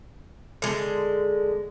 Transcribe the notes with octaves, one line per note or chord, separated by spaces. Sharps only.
D3 G#3